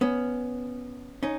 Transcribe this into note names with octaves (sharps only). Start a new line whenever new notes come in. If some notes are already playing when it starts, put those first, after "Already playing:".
B3 C#4
C#4 D#4